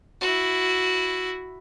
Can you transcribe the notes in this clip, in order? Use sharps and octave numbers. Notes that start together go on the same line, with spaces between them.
E4 F#4